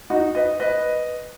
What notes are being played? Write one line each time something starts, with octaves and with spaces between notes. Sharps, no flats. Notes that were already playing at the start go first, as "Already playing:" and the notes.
D#4 F#4
B4 D#5
B4 D#5